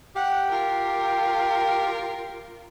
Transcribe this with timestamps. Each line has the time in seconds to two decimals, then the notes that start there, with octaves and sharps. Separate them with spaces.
0.15 G4 F#5
0.51 F4 A#4